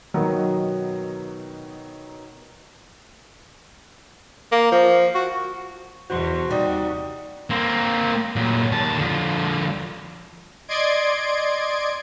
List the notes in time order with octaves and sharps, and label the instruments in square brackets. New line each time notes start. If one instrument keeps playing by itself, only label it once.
[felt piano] B2 D#3 F#3 B3 D#4
[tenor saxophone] A#3
F3
F#4
[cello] E2 B2 [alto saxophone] F#4 [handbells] C5 C6 C#6
[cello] D#2 C3 [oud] G3 [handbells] D#4 D5 D#6
[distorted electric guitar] A#3 C4
A#2 F#3
D#2 A5
D3 F3
[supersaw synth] D5 D#5 C6 G#6 D7